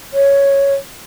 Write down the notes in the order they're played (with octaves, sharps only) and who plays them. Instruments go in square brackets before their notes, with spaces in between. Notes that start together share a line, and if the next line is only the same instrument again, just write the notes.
[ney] C#5